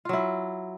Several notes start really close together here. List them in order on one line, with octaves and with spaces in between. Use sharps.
F4 F#3 E4